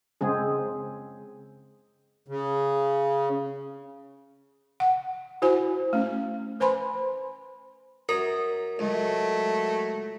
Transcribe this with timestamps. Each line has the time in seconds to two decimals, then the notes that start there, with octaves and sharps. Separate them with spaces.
0.21 C#3 G#3 C4 G#4
2.28 C#3
4.80 F#5
5.42 E4 F#4 C5 G#5
5.93 A3 C#4
6.60 B4 C5 G#5 B5 C6
8.09 F#2 A#4 A#5
8.79 C#2 F#3 A3